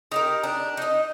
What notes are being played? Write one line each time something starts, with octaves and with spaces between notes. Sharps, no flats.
D#4 G4 A#4
D4
D#4 D#5